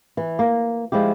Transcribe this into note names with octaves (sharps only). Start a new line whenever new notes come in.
E3
A#3
F3 G#3 E4 G4